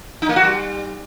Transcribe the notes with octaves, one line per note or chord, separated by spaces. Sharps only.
D#4
A#3
F#4
G3